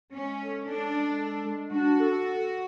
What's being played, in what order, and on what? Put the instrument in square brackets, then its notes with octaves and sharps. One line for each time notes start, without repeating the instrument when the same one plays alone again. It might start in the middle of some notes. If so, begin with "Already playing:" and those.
[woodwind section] G#3 [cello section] C#4
[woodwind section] A4
[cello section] D4 [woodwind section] A4
[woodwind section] G#3
A4
G#3
[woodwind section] D4 [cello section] F#4
[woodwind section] A4